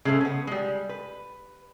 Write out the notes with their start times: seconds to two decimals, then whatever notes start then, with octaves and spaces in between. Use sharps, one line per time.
0.05 C#3 G#3 A3 A4 C5
0.21 B3 C#4
0.47 G3 G#3
0.89 B4